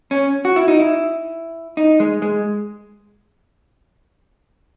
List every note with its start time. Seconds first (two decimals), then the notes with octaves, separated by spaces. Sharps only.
0.11 C#4
0.45 F#4
0.56 E4
0.68 D#4
0.80 E4
1.77 D#4
2.00 G#3
2.22 G#3